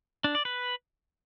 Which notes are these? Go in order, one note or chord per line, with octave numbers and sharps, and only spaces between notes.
D4
D5
B4